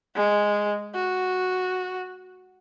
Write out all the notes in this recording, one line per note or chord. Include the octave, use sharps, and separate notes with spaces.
G#3
F#4